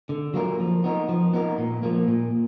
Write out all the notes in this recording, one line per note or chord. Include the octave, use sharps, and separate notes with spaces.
D3
F#3 A#3 F4 A#4
F3
B3 D#4 A#4
F3
B3 D#4 A#4
A#2
F3 A#3
A#2